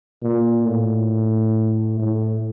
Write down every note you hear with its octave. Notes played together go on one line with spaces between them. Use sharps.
A#2
A2
A2